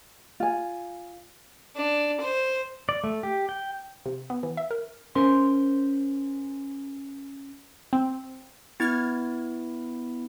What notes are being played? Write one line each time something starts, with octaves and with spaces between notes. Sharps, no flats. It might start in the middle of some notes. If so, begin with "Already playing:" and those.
F4 G#5
D4
C5
D5
A3
G4
G5
C3
B3
E3
E5
A#4
C#4 A#4 C5 C6
C4
B3 E4 F6 G#6 A6